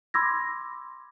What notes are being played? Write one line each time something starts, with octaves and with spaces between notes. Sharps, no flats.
B5 C6 D6 E6 G#6 A#6